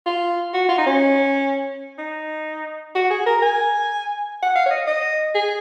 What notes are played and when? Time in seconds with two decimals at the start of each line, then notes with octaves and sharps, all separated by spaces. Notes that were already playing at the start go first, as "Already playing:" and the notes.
0.06 F4
0.54 F#4
0.69 F4
0.78 D#4
0.86 C#4
1.98 D#4
2.95 F#4
3.10 G#4
3.26 A#4
3.42 G#5
4.43 F#5
4.55 F5
4.66 C#5
4.71 D#5
4.87 D#5
5.35 G#4